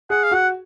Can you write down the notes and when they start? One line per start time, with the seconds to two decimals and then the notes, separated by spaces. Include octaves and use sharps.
0.10 G#4 F#5
0.23 F5
0.32 F#4 F#5